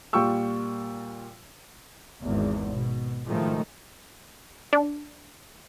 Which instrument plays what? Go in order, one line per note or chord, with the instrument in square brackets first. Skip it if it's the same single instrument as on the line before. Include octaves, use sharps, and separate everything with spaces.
[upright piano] A#2 G3 F4 G5 C#6 E6
[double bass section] G#1 E2
B2
A2 D#3 F3 G#3 A3
[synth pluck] D4